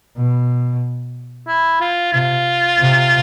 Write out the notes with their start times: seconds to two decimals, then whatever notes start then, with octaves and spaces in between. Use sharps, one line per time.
0.16 B2
1.47 E4
1.81 F4
2.12 C3 F4
2.79 C3